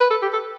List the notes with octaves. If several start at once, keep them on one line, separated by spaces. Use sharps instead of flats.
B4
A4
G4
A4